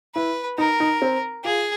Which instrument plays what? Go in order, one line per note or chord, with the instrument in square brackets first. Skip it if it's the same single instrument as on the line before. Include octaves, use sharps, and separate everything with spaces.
[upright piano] E4 [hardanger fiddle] B4
[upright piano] D#4 [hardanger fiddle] A#4
[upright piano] D#4
C4
[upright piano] F4 [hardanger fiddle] G#4